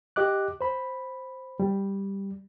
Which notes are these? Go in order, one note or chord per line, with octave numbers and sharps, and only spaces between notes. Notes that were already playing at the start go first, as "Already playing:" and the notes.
G4 D#5 D6 F#6
C5 B5
G3